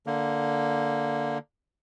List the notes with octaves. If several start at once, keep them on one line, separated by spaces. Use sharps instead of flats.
D3 A#3